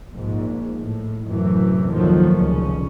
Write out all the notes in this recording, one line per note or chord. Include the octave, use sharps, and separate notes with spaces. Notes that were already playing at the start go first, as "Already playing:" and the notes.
A#1 G#2
A2
F#2 A2 C3 E3
D#2 A2 D#3 F3 F#3 A3
F1 C#2 A#2 C#3 C#4